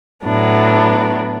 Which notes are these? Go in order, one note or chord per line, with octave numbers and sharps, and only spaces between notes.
A2 F#3 B3 D4